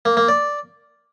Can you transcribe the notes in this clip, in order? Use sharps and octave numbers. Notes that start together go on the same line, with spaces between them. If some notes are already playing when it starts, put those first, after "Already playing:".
A#3
A#3
D5